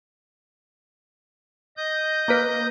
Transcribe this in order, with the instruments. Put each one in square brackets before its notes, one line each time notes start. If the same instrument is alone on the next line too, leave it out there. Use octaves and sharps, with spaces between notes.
[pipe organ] D#5 D#6 G6
[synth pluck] A#3 A#4 B4